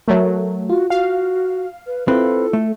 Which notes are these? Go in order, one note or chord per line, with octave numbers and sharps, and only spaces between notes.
F#3 A3 A#4
F4 F#4
F#4 F5
B4
C4 E4 F4 A4 B4
A3